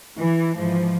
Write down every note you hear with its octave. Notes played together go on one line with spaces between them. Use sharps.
E3
G#2 E3 F3